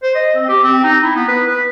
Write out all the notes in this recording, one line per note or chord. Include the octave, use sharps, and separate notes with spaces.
C5
D#5
C4
G4
C4
D#4
E4
B3
B4
B4